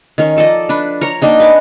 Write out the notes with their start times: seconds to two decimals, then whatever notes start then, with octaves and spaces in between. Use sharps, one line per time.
0.18 D#3 C#4 A#4
0.37 F3 A4 D5 D#5
0.69 D4 B4 B5
1.01 A#4 C#5 A#5
1.22 A#3 D4 D#4 G5
1.40 B4 G#5 D6